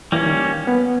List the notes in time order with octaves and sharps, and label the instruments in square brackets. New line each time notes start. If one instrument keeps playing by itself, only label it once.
[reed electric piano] E3 [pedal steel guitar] G3 A#3 C#4
[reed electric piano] D#3
B3